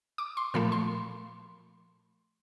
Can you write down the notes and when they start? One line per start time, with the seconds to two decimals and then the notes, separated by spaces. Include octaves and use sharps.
0.18 D6
0.37 C6
0.54 A#2 F3 A3 B5
0.72 C6